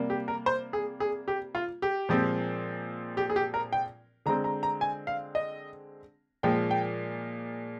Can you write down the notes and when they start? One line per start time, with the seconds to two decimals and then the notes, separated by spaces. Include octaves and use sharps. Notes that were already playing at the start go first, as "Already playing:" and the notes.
Already playing: C3 G3 A#3
0.10 G4
0.28 A#4
0.46 C5
0.73 G#4
1.00 G#4
1.28 G4
1.55 F4
1.82 G4
2.09 A#2 F3 G#3 C4
3.17 G4
3.30 G#4
3.36 G4
3.54 A#4
3.73 G5
4.26 D3 G#3 C4 A#5
4.44 A#5
4.63 A#5
4.81 G#5
5.07 F5
5.35 D#5
6.43 A#2 F3 G#3 G5
6.71 G5